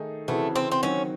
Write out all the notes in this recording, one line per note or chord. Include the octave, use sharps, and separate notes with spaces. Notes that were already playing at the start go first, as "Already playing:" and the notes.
Already playing: D#3 A3 D#4 G#4
C#3 E3 A3 C4 F#4
C4
C4
D#3 F#3 C4 C#4 F#4